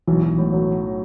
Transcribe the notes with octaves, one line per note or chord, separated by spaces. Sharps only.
B1 E3
B1
A2
F#3